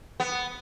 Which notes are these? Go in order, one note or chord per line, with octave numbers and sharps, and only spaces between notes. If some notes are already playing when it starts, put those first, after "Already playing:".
B3